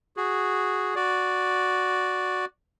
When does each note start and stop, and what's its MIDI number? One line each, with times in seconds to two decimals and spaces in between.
0.17 0.95 66
0.17 0.95 68
0.95 2.45 66
0.95 2.45 74